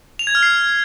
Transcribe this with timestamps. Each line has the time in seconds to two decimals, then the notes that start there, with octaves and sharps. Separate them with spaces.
0.19 F7
0.27 G#6
0.35 F6
0.43 C7